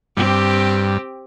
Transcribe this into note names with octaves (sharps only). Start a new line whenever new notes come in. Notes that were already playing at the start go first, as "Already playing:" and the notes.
G2 C4 G4